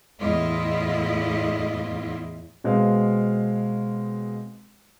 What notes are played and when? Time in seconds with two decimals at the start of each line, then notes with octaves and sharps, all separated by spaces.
0.21 E2 A2 E4 F4 D#5
2.64 B2 G#3 C4 F5